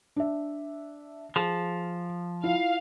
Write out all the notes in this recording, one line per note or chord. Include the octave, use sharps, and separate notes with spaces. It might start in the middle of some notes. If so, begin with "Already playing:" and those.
D4 E5
F3 G#4
E4 F4 F5